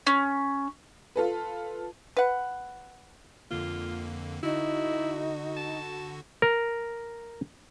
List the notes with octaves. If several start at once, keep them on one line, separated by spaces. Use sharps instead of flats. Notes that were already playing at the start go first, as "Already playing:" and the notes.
C#4
F4 A4 B4
B4 F#5
F2 D3 A#3 F4
D3 D#4 E4 F#4
A5
A#4